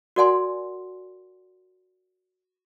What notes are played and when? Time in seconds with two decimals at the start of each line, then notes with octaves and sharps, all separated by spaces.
0.16 F#4 A#4 D5 F#5 G#5 C6